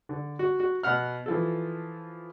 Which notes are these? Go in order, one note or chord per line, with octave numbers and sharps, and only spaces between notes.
D3
F#4
F#4
B2 F#5 F6
E3 F3 A4